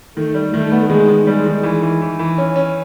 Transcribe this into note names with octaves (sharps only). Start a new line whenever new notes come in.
D#3 A3
G3
D#3 A3
B3
D#3 G#3
D#3
G3 G#3
D#3
E3
E3
E3
E3
C#4
C#4